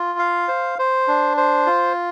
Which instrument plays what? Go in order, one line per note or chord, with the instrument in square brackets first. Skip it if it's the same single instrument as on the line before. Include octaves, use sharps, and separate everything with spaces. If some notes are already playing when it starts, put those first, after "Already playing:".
Already playing: [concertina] F4
F5
C5
C5
D4
C5
F4